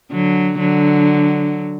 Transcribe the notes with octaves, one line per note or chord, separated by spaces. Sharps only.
D3 F#3
D3 F#3